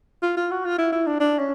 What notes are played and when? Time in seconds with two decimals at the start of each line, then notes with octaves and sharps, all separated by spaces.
0.23 F4
0.37 F4
0.51 F#4
0.65 F4
0.78 E4
0.92 E4
1.07 D4
1.20 D4
1.39 C#4